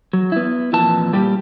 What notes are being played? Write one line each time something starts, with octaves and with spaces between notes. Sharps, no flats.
F#3
B3 E4
F2 A#2 E3 A5
A#2 G3 G4